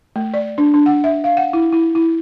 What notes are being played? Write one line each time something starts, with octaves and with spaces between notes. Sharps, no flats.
A3
D5
D4
D4
F#5
E5
F5
F#5
E4
E4
E4